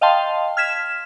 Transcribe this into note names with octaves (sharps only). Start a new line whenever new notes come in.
D#5 F5 G5 A5 C6
F6 G#6 B6 E7